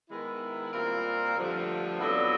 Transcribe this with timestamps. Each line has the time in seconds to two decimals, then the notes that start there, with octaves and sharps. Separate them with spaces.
0.09 D#3 G#3 B3 E4
0.72 A#2 G3 C4 F4 A#4
1.35 G2 D3 F3 A3
1.99 F2 D3 F#3 B3 E4